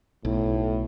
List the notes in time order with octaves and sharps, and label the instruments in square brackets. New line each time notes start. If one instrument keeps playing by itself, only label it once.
[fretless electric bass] B1 [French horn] A2